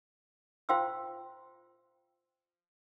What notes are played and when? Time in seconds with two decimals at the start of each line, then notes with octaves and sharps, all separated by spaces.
0.69 F4 C5 F5 G5 C6 E6